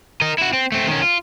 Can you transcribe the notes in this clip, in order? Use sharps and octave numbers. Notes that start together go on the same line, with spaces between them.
A#4 D#5
E4 F#4
C4
A3 C4
D#3 C#4
F4